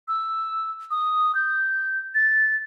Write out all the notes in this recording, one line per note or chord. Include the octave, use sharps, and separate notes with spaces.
E6
D#6
G6
A6